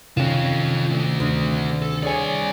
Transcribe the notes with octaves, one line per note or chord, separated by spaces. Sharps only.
C3 D#3 C#4 F4 A4 E7
A3 D4
D2
A4
C2 G#4 C#5 D5 G#5